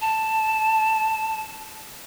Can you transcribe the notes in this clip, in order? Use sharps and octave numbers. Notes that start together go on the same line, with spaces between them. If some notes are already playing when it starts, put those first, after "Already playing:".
A5